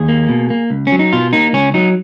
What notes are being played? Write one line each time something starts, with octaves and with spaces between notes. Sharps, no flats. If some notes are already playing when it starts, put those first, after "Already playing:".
Already playing: D#2 G#4
A#3
B2
A#3
C#2
C#4
F#3
D#4
B2 F4
A#3 D#4
C#2 C#4
F#3 D#4